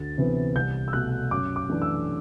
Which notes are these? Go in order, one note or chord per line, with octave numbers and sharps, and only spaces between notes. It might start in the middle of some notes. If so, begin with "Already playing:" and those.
Already playing: D2 A6
C3 E3 B3
C2 G6
E6
B2 A3 F#6
F#2 D6
D6
E3 A3 D4
E6